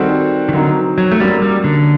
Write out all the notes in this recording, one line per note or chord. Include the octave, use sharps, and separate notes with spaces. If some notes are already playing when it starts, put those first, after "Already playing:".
Already playing: D#3 G3 C4 F#4 A4
D#3
D3 F#3 C4 D#4 F#4 A#4
F#3
A3
F#2 F#3 G3 A#3
G3
D3